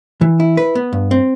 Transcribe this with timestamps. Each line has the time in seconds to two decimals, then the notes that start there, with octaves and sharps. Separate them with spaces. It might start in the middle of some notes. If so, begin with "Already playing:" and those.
0.21 E3
0.40 E4
0.57 B4
0.75 B3
0.93 G2
1.11 C4